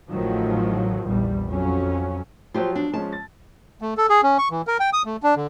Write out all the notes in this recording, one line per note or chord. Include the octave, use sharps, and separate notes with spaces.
A1 A2 D#3 F3 F#3
A#1 E2 G3
F2 F#3 C#4
F3 F#3 F4 G4 C5
D4
F3 G#3 C#4 A5
A6
A3
A4
G#4
C#4
C#6
E3
A#4
G5
D#6
A3
D4
D3